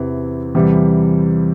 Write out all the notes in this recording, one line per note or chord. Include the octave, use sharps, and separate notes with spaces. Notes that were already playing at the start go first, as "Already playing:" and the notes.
Already playing: E2 C3 E3
E2 C3 E3 G3